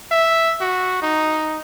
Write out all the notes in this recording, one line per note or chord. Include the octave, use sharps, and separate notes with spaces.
E5
F#4
D#4